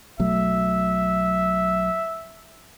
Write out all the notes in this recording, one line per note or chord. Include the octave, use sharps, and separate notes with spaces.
B1 F#3 A3 E5